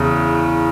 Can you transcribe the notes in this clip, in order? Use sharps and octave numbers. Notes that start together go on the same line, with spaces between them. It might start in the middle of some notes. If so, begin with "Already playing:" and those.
Already playing: E2 C#3